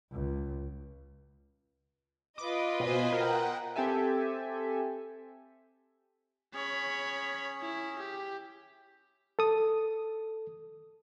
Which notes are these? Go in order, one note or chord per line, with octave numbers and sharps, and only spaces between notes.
C#2
F4 B4 D#5 D6
B2 C5 G#5 B5
A#4 F#5 G5
C4 G4 A4 E5 G#5
C#4 G#4 C#5 B5
E4
G4
A4 D#6